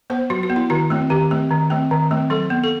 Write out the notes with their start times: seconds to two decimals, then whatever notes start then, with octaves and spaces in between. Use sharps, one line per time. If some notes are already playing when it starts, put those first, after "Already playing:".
0.10 B3 C5
0.30 F#3 F#4
0.43 F#4
0.50 B3
0.56 E4
0.70 D#3 F#4
0.90 A3 C4
1.10 D#3 G4
1.31 A3 C4
1.51 D#3
1.70 A3 C4
1.91 D#3
2.11 A3 C4
2.30 F#3 A4
2.50 B3
2.64 A4